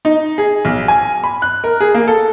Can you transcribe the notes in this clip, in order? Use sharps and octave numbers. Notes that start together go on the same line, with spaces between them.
D#4
G#4
B1
G#5
B5
F#6
A#4
G#4
A#3
A4